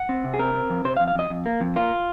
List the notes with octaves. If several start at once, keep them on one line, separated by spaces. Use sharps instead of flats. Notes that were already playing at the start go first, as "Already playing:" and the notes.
Already playing: F#5
C4
C3
G#4
C4 A#4
C4
F2
C3 C5
F5
F2
F5
F2 D#5
F2
A#3
F2
A#3 F4